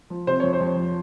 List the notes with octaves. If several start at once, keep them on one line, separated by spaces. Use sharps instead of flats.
F3
C3 C5
F2 C#5
C5
F2
F3